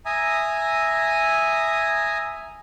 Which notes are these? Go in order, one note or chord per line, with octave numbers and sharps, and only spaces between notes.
E5 G#5 A#5 D#6